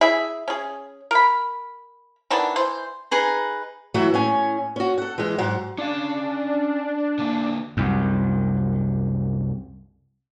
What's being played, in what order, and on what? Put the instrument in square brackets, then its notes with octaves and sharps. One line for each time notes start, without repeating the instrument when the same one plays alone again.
[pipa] E4 G#4 E5
C#4 G#4
A#4 B5
D#3 E3 B3 D4
E3 C5
[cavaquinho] D#4 G#4 B4 A#5
[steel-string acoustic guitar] E3 F#3 A3 E4 F#4
A2 C#4 G#5
C#4 F#4
A4 F#5
E3 G#3
G#2 F#3 F#5
[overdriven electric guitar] C#4 F5 [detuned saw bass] D4
[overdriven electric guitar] D3 A#3
[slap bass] C2 F#2